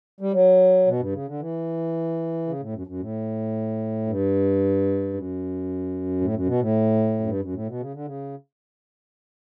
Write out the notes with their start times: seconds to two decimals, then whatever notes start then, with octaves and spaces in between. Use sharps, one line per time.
0.20 G3
0.33 F#3
0.87 B2
1.00 G2
1.12 C#3
1.27 D3
1.40 E3
2.47 C#3
2.60 A2
2.73 F#2
2.87 F#2
2.99 A2
4.07 G2
5.14 F#2
6.21 A2
6.34 F#2
6.46 B2
6.60 A2
7.20 F#2
7.26 G2
7.40 F#2
7.53 A2
7.67 B2
7.80 C#3
7.94 D3
8.06 C#3